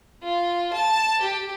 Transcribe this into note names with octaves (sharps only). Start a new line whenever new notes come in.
F4
A5
G4